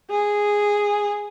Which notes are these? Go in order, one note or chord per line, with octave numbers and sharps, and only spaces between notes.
G#4